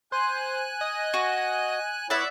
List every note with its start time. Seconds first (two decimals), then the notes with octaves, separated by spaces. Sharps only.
0.12 C5 G#5 F#6
0.81 D#5
1.14 F#4
2.10 B3 E4 C#5 D5 E5 F#5